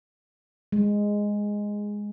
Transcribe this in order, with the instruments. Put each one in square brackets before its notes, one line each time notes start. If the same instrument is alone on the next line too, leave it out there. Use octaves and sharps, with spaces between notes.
[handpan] G#3